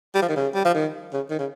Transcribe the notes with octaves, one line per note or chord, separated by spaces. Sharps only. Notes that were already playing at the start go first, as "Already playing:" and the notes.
G3
F3
D#3
C#3
G3
F3
D#3
C#3
D#3
C#3